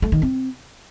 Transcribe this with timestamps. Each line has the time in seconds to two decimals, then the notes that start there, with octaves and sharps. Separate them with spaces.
0.02 A3
0.12 D#3
0.22 C4